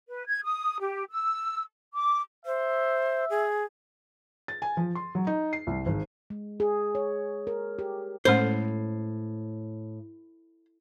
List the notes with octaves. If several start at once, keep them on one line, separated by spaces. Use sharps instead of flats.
B4
G#6
D#6
G4
E6
D6
C5 E5
G#4
A6
G#5
F3
C6
F#3
D#4
C7
C2
G#1
G#3
G#4
C#5
A#4
G4
A2 G#3 C#4 A4 C5